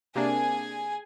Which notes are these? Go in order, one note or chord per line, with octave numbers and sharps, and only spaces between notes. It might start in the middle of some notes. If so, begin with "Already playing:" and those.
C3 A#3 D4 G#4 G#5